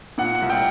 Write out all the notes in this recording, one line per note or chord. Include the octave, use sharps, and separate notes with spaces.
A#2 F#5
C2
G5